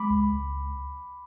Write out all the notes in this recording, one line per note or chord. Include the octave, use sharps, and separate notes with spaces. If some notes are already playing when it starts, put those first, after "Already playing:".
Already playing: G#3 B5 D6
C#2
C#2